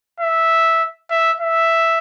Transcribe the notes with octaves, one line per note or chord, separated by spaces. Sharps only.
E5
E5
E5